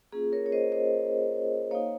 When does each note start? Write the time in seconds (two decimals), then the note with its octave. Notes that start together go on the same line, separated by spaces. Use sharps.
0.12 A#3 C#4 F4 G#4
0.32 A#4 C#5
0.46 C#5
0.52 C5 D#5
0.72 C5 D#5
1.71 A#3 D#4 C#5 F5